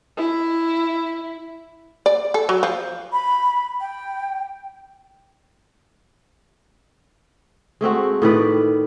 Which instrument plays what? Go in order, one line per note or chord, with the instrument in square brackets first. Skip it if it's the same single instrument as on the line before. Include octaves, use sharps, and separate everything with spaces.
[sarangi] E4
[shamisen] D5
A4
F#3
F3
[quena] B5
G5
[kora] G#3 A3 C4 F#4
A2 D#3 B4 D5